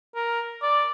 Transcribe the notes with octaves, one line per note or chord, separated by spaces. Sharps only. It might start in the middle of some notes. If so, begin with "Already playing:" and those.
A#4
D5